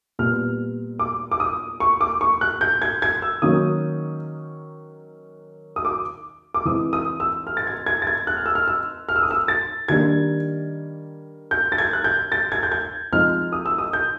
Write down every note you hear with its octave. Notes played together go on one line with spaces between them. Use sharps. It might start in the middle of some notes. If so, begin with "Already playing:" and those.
A#2 G3 B3 F6
D6
D6
D#6
C#6
D6
C#6
F#6
G6
G#6
G#6
E6
D#3 F#3 A#3 C#4 D#6
D#6
D6
D6
E3 G#3 C4 D#6
D#6
E6
F6
A6
G#6
G#6
A6
G#6
F#6
F6
E6
F6
E6
F6
E6
D#6
E6
A6
D#3 G3 A#3 D4 G#6
G6
A6
G#6
F#6
G6
A6
G#6
G6
G#6
F3 G#3 C4 D#4 F6
D#6
E6
D#6
G6